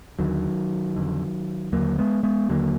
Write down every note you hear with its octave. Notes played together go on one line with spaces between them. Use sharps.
D#2 D3 D#3 F#3
F2 D3
D#2 D3 F#3 A#3
G#3 B3
G#3 B3
D#2 D3 F#3 A#3